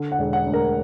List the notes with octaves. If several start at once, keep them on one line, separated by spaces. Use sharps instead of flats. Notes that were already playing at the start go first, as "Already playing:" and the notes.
Already playing: D3
F#5
E1
F#5
D2
A#4